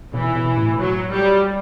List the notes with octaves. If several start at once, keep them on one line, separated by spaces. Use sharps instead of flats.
B2 E3
B2
A2
F#3
G3